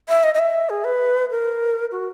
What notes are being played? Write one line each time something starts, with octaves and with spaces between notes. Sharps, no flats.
E5
D#5
D#5
E5
G#4
B4
A#4
F#4